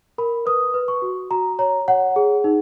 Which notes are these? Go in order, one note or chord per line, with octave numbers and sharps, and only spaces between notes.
A#4 B5
B4 D#6
B4
C#6
F#4
F#4 A#5
C#5 A#5
C#5 F#5
G#4
D#4